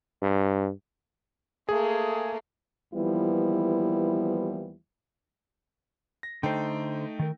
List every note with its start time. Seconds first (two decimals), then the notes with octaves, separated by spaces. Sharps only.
0.22 G2
1.69 A3 A#3 G#4
2.94 D#2 E3 F3 G3 B3 E4
6.23 A#6
6.43 D3 A3 D#4 C5 G5
7.19 D#3 A#4